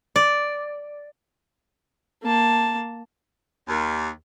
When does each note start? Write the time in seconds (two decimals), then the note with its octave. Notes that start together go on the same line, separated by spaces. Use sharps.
0.16 D5
2.23 A#3 A5
3.68 D#2